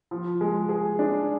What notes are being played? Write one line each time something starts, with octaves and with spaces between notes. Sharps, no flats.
F3
G#3
G#4
D4